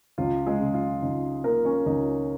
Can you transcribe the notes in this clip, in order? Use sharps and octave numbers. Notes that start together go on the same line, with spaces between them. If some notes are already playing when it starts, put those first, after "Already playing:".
C#2 F4
G#3 G#4
C#3
F4
C#2 D#4
C#3 A#3 A#4
C#4 C#5
C#2 D#4 D#5